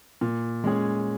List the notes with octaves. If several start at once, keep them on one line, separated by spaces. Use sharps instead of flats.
A#2
G#3 C#4 G#4